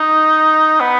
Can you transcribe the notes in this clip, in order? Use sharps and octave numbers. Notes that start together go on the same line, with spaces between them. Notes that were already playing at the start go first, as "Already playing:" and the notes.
Already playing: D#4
B3